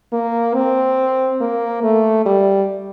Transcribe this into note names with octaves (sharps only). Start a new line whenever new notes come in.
A#3
C4
A#3
A3
G3